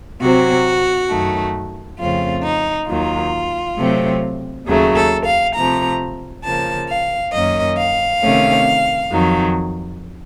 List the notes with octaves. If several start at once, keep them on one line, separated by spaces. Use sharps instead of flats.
C3 F#3 C4 F#4
F#2 D#3 A3
F2 C#3 A3 C4 F4
D#4
D#2 D#3 F#3 F4
C3 F#3 A3 C4
D#2 C#3 F#3 A3
A4
F5
C3 F3 A3 A#5
C#3 F3 A#3 A5
F5
F#2 D#3 A#3 C#4 D#5
F5
C3 D#3 A3 C#4
F2 D#3 F#3